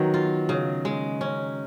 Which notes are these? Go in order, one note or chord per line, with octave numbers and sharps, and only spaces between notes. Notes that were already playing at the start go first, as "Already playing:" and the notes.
Already playing: D#3 F#3 B3
F4
C#3
G#3
C#4